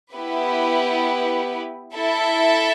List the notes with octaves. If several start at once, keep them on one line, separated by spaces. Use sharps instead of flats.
B3 E4 G4 B4
E4 A4 E5 A5